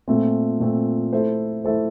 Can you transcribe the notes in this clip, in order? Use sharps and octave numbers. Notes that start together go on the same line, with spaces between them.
A#2 A3 C4
A#2 A3 C4
A3 E4 A4 C5
A3 E4 A4 C5